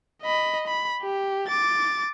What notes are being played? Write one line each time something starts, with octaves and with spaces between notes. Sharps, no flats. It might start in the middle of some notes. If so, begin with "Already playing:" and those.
D#5 B5
B5
G4
D6 A6